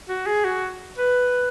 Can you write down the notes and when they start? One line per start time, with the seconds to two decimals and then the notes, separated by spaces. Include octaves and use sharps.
0.09 F#4
0.27 G#4
0.45 F#4
0.98 B4